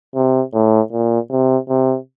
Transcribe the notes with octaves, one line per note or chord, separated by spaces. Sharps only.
C3
A2
A#2
C3
C3